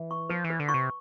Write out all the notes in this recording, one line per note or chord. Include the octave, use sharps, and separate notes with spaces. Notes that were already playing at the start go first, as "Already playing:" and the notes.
Already playing: E3
C#6
F3 B4
E3
B4
D3
C#6
C3